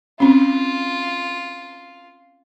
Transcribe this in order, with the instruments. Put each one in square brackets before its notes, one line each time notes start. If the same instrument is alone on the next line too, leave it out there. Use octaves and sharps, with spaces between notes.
[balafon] C4 C#4 [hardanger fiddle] F4